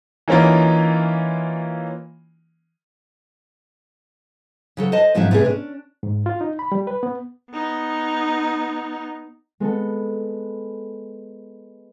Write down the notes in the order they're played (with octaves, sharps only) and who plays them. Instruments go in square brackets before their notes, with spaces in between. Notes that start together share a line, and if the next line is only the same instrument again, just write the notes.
[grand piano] E3 A#3 C#4 D#4 F4
[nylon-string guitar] C#3 F#3 A4
C5 D#5 A5
G#2 C3 F3 F#3 C#4 E4
A2 C3 B3 G#4
C#4 D4
[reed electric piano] G#2
F4
D#4
B5
G3
B4
B3
[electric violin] B3 D#4
[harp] G#3 B3 A4